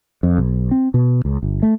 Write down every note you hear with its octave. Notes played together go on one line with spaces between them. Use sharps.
F2
B1
C4
B2
C#2
G1
A3